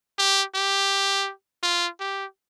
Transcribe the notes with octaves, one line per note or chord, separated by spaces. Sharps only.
G4
G4
F4
G4